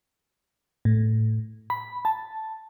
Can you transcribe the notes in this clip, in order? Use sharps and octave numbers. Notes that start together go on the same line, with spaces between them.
A2
B5
A5